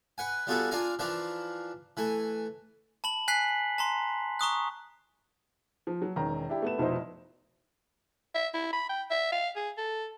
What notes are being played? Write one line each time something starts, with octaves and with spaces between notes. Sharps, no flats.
B4 F#5 G#5
G3 B3 F4 F#4 G#4 A4
D4 F4 A#4 F5 G#5 A#5
E3 F3 D4 A#4 F5
E3 A3 G#5
A5 B5 F#7
G#5 F#6 B6 C7 F#7
A5 A#5 C6
A#5 C#6 D#6 F#6
F3
F#3
E1 D#3 C#4 A#5
D4 E4 G4
A3 B3 E7
F1 B2 F3 D#4 E4 C5
E5
E4
B5
G5
E5
F5
G#4
A4